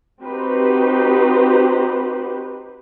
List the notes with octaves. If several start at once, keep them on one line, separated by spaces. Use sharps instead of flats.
C4 D#4 F#4 G4 B4 C5